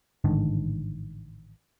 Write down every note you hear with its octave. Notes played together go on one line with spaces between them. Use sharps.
A1 G#2 D3 D#3